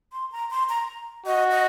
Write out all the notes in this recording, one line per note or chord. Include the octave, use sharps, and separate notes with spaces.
C6
A#5
C6
A#5
F#4 D#5
D#5